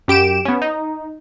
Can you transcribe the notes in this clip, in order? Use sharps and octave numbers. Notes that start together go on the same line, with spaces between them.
F#2 G4 D7 E7
B3 C#4
D#4